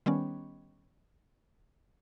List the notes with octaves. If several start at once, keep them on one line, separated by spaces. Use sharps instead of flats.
D#3 G3 B3 C#4